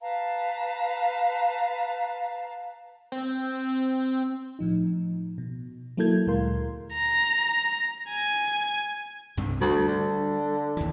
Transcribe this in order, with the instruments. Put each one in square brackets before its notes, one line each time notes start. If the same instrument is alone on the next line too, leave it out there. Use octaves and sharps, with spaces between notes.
[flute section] B4 F5 A5 A#5
[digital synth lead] C4
[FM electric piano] A2 F3 D#4
B2
F#3 A#3 E4 A4 G6 G#6
D2 A#2 G#3 A#4 F5 C6
[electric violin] A#5
G#5
[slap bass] C2 G2 C3
[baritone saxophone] D2 [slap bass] G3
[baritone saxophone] D3
[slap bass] D#2 E3